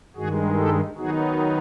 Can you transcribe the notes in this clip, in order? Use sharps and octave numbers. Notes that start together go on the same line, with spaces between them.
G2 D#3 G#3 F#4 G#4
G4 A4
D#3 F#3 B3 D#4 F#4 G#4